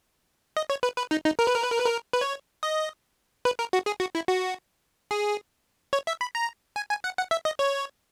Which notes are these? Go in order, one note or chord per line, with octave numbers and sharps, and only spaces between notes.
D#5
C#5
B4
B4
D#4
D#4
A#4
B4
A#4
B4
A#4
B4
A#4
B4
C#5
D#5
B4
A#4
F#4
G#4
F#4
E4
F#4
G#4
C#5
E5
B5
A#5
G#5
G#5
F#5
F#5
E5
D#5
C#5